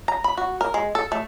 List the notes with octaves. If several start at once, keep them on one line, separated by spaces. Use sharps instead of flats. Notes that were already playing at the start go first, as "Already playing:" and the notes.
A#5
B5
F#4
A#4
G#3
A4
A3